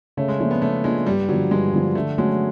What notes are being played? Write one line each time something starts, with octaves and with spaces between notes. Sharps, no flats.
C#3 A3
G#3
F3 A3 A#3 D4 F4
B3
C#3 A3
F3 G#3 A#3 D4 F4
G2 G3
D3 F3 F#3
G2 G#3
D3 F3
D3 A3
F#3 G#3 A3 C#4 F#4